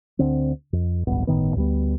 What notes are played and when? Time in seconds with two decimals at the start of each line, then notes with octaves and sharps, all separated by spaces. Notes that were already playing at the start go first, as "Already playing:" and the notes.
0.19 D2 D3 C4
0.73 F2
1.07 D1 A1 G2 B3
1.27 G1 A2 D#3 B3
1.56 D2 G3 B3